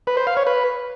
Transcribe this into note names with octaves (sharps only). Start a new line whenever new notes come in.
B4
C5
F5
C#5
B4